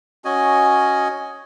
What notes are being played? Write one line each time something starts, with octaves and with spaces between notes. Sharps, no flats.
C#4 F#4 D#5 G#5